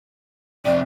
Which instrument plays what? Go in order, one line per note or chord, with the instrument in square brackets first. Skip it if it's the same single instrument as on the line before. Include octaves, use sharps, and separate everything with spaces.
[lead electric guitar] F2 C3 [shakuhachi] D5